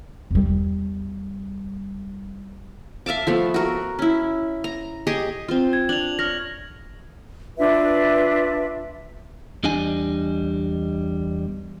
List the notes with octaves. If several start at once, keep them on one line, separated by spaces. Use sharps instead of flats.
E2 G3
E5 F5 A5 D6
F3 A3 B3
F#4 A#4
C#4 E4
A#5
G4 G#4 D#5 C#6
C4 F4
G#6
D4 F7 F#7
C#5 F6 A#6
D4 F4 B4 E5
E2 G3 D4 D#5 G#5